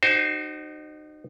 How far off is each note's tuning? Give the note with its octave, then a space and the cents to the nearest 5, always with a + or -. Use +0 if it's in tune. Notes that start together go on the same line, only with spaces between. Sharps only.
D#4 -30 F#4 +30 C5 +0